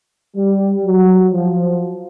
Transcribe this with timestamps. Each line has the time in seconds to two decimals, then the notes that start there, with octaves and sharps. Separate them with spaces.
0.36 G3
0.84 F#3
1.32 F3